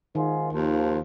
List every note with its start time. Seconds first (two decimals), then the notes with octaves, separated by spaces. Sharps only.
0.15 G#2 D#3 F4 G#4
0.53 D#2 F3